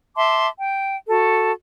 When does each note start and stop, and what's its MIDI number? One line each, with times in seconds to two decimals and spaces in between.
0.16 0.47 76
0.16 0.47 81
0.16 0.47 84
0.16 0.47 86
0.57 0.97 79
1.07 1.51 66
1.07 1.51 69